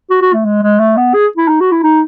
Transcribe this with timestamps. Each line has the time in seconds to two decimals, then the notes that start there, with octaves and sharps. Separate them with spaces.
0.10 F#4
0.22 F#4
0.33 A3
0.45 G#3
0.62 G#3
0.79 A3
0.97 B3
1.14 G#4
1.38 E4
1.48 D#4
1.61 F#4
1.72 E4
1.83 D#4